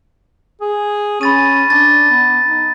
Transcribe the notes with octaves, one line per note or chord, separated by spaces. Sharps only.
G#4
C#4 B5 A6 D#7
D4 A6
B3
D#4